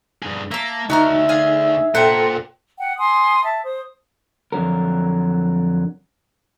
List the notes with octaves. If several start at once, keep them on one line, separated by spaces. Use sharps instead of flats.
G2 G#4
A#3 E5 A5
D2 D#4 F#4 E5 A#5 F6
G#4 F5 G#5
A#2 D4 A4 C5 F#5 G5
F#5 G5
G#5 C6 D#6
E5 A5
C5 D#6
F2 D3 F#3 A#4